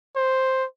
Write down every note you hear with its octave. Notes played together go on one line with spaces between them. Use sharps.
C5